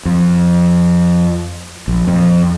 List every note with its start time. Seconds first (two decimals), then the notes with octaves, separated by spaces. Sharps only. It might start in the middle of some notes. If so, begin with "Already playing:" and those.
0.05 F2
1.88 A#1
2.08 F2